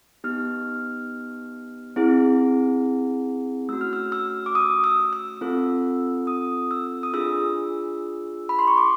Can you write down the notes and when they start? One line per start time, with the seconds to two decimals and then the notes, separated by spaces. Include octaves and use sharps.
0.24 B3 D#4 G4 F6
1.96 C4 E4 G#4
3.69 A3 C#4 F#4 E6
3.81 F6
3.93 E6
4.12 E6
4.46 D6
4.55 D#6
4.84 E6
5.13 E6
5.41 C4 F4 A4
6.27 D#6
6.71 E6
7.03 D#6
7.13 D4 F4 G#4 E6
8.49 B5
8.59 C6
8.68 C#6
8.77 D6